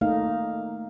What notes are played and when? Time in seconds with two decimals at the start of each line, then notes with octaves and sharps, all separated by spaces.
0.01 A3 A#3 D#4 F5